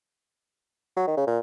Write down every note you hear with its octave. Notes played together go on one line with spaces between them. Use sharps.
F#3
D#3
C#3
A#2